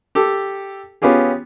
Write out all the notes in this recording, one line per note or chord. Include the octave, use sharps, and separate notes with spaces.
G4 A4
B3 C#4 F4 G4 G#4